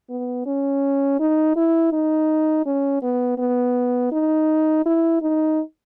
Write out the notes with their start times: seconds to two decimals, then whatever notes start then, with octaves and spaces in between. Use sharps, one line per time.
0.10 B3
0.46 C#4
1.20 D#4
1.56 E4
1.93 D#4
2.66 C#4
3.03 B3
3.38 B3
4.12 D#4
4.86 E4
5.22 D#4